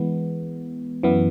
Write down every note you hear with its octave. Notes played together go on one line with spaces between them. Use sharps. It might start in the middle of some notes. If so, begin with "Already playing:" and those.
Already playing: E3 G#3 B3
F#2 E3 B3